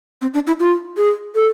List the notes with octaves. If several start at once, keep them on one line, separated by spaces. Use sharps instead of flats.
C4
D4
E4
F4
G#4
A4